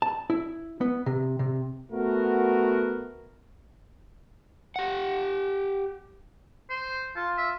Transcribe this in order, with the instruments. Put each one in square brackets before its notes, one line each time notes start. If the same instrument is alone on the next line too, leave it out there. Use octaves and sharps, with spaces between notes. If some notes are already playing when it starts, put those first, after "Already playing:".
[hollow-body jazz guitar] A5
E4
B3
C3
C3
[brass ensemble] A3 B3 F#4 A#4
[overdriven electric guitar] G4 F#5
[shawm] C5
[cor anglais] F4 [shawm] A5
[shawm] E5